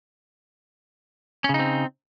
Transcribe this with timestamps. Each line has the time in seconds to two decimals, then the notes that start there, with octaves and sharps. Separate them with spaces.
1.44 C#4
1.49 C#3
1.54 D#4
1.59 C4